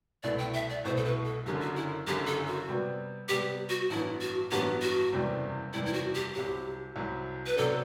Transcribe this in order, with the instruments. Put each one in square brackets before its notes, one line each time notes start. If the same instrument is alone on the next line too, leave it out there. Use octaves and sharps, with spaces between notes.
[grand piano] C2 B2 A3 E4 [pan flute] D5
[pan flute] G5
E5
D5
[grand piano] C2 B2 A3 E4 [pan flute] C5
[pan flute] A4
B4
A4
[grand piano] F#1 F#2 D3 [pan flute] G4
[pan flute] F#4
E4
[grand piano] F#1 F#2 D3 [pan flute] G4
[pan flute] A4
F#4
[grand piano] C3 G3 B3
[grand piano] C3 G3 B3 [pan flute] G4
[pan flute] F#4
[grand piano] A1 G2 F#3 B3 [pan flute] E4
[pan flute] F#4
[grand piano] A1 G2 F#3 B3 [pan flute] G4
[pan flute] F#4
[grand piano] F#1 E2 C3 G3
[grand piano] F#1 E2 C3 G3 [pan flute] E4
[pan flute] E4
F#4
G4
[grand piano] C2 C3 F#3 [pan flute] G4
[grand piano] C2 C3 F#3
[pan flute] B4
[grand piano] C3 F#3 B3 D4 [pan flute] A4